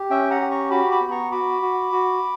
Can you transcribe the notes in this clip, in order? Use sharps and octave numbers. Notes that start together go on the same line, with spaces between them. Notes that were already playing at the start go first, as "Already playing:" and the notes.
Already playing: G4
C#4 E5 G5
F#5 A#5
G4
A#5 C#6
F#4 B5 D6
B5 D6
B3
A#5 C#6
F#4 B5 D6
F#4
F#4